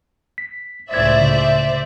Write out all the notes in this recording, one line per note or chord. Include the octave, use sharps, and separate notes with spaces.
B6
C#2 A2 C5 D5 E5 G#6 A6
C#3